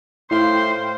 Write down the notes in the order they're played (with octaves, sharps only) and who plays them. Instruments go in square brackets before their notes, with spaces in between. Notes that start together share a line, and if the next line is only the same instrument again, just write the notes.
[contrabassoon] A2 [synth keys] E4 F5 G5 [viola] C5 [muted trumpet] C6